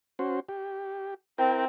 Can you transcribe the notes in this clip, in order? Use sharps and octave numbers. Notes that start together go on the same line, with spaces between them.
C#4 F#4 C5
G4
C4 E4 A#4 G5